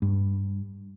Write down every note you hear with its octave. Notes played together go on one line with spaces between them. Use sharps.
G2